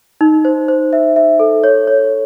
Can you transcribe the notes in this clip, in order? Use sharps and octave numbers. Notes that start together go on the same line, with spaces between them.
D#4
C5
C5
E5
E5
A4
C#5
C#5